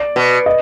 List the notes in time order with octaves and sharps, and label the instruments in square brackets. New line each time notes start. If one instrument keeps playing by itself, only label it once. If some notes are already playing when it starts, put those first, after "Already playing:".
Already playing: [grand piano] D5
[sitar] B2
[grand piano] D#5